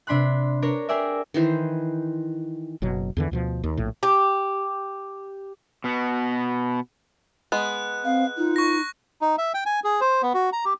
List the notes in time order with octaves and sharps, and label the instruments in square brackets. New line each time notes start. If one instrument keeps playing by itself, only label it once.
[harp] C3 D4 B5 C6 F#6
D4 A#4 C#5
G4 G#4 A#4 D5 E5
[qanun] D#3 E3 C5
[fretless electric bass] F#1 B2 F#3
E2 D3 E3
D2 B2 F3
D#2
A#1 A2
[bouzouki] G4
[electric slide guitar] B2 B3
[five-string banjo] G#3 B3 [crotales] F#6
[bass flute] C4 [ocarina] F5
[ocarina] D#4 [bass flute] F4
[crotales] C#6 A#6
[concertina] D#4
E5
G5
G#5
G#4
C5
B3
F#4
A#5
G4